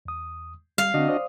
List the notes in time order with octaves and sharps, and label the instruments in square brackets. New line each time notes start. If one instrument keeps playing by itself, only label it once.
[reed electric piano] E2 D#6
[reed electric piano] G3 [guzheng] F5
[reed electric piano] D3 C4 [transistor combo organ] D4 F#4 D#5
[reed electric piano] C5 D5 D#6